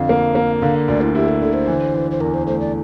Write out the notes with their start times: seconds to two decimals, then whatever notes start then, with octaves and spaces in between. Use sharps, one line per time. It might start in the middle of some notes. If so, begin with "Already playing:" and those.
Already playing: F2 D3 F5
0.09 A#3
0.35 A#3
0.62 D3 F5
0.88 D2 D5
1.01 E4
1.15 E4 G4
1.28 A4
1.41 D3 A4
1.54 C5
1.68 E3
1.94 E3
2.11 C5
2.20 E2 A#4
2.34 C5
2.47 A3 C5
2.60 D5